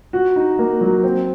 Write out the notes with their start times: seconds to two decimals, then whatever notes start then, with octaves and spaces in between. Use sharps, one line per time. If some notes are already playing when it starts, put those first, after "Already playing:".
0.13 F#4
0.36 D#4
0.59 A#3
0.81 F#3
1.03 C4